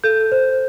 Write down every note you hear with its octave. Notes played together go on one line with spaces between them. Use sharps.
A4 G6
C5